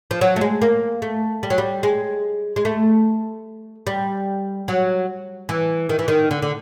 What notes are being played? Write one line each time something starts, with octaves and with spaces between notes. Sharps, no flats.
F3
F#3
A3
G#3
A#3
A3
G3
F#3
G3
G#3
G#3
A3
G3
F#3
E3
D#3
E3
D#3
D3
D3